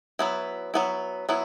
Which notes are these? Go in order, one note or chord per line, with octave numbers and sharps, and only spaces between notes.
F#3 B3 E4
F#3 B3 E4
F#3 B3 E4